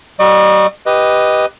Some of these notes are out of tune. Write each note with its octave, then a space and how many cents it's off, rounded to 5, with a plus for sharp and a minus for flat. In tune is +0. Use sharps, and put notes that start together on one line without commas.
G3 -45 D#5 -45 C#6 +0
G4 +0 B4 +0 D#5 +0